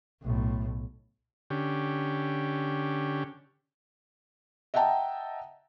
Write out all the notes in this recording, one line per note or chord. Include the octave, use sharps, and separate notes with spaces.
B1 A2
D3 C#4 G4
D#5 E5 F#5 G5 A5 A#5